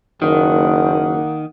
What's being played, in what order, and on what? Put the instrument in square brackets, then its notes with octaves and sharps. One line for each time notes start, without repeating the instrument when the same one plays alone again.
[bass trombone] F#1 [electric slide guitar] D#3 [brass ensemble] A#3 F#5